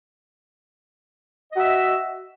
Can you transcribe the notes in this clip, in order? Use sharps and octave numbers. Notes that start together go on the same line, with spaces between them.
F#4 D#5 E5